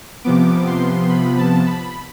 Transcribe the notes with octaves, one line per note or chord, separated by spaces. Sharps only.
C3 F3 B3 D6
C6
B5
A5
B5